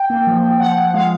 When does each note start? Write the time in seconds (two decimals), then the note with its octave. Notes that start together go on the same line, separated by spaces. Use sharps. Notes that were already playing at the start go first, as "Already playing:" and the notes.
Already playing: G5
0.10 A#3
0.27 F3
0.44 F3
0.60 F3 F#5
0.77 F3
0.94 G#3 F5